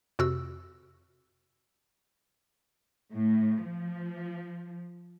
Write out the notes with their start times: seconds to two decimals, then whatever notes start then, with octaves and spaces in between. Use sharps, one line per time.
0.19 F2 C3 F#4 E6
3.14 A2
3.65 F3